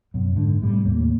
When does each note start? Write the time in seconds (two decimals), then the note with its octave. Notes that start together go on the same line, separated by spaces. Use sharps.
0.14 F#2 B2
0.35 G#2 D3
0.62 A2 C3 G3
0.85 D#2 A2 A#3